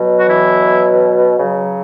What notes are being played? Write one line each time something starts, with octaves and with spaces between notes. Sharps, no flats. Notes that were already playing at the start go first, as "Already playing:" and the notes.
Already playing: B2 F#3
F#4
E3 E4
C#3 F#3